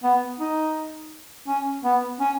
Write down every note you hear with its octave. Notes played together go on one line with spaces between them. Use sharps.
B3
D#4
C#4
B3
C#4